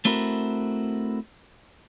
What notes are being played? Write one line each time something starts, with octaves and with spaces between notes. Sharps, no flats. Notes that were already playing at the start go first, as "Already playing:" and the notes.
A3 C4 E4 F#4 A#4